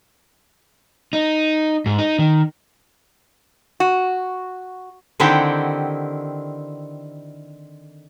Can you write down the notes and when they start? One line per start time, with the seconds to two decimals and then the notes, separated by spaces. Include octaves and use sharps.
1.13 D#4
1.86 G#2
1.99 D#4
2.19 D#3
3.80 F#4
5.20 D3 D#3 C4 E4 G4 F#5